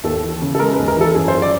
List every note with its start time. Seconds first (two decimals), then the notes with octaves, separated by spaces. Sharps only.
0.04 D#2 A4
0.23 E3
0.41 C#3
0.55 A4
0.59 G#3 A#4
0.73 B4
0.78 D#2
0.88 A#4
0.97 E3 A4
1.15 F#2 G#4
1.28 C5
1.33 F3
1.42 D5